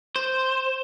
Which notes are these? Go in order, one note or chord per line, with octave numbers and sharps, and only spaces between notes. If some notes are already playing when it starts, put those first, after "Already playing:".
C5